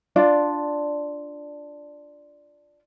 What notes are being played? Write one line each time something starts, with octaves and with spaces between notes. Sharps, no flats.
D4 F4 D5